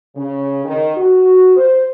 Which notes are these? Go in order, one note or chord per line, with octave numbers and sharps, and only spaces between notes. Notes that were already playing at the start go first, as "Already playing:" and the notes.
C#3
D#3
F#4
C5